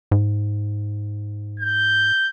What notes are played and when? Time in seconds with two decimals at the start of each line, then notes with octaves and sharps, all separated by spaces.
0.11 G#2
1.60 G6